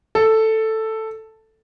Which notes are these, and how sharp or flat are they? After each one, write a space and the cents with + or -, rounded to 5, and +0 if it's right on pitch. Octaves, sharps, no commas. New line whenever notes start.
A4 +5